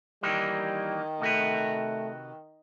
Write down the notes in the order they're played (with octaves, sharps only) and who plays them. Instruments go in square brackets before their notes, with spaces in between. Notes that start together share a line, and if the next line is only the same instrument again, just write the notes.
[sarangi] D#3 [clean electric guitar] E3 A#3 D#4 [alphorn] G3
[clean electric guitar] C3 F#4 B4 [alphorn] A3